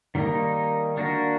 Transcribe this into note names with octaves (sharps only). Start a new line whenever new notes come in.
D#3 G3 A#3 D#4
A#3 D4 F#4 A#4